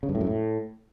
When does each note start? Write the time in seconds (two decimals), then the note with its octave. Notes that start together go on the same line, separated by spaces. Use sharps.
0.03 C#3
0.09 G2
0.15 A2
0.21 F#2
0.27 A2